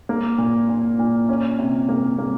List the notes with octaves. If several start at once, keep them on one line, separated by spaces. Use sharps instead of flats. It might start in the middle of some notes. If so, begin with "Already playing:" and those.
A#3
A#2
A#2
A#2
C#4
C3
A#3
A#3